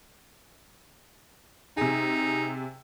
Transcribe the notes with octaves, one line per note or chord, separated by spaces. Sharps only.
C3 D#4 G#4